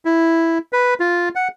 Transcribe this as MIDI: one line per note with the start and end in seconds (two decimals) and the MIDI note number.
0.05 0.58 64
0.73 0.94 71
1.00 1.29 65
1.35 1.48 78